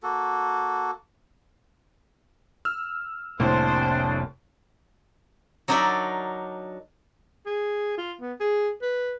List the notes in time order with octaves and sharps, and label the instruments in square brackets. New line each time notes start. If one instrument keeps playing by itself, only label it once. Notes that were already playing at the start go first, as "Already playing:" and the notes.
[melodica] A#3 F#4 A4
[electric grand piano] E6 F6
[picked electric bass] F1 C3 A#3 [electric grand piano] C2 A2 [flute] D4 [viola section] C5
[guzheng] F#3 D4 D#4 A#4 D5 E5
[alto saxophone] G#4
F4
B3
G#4
B4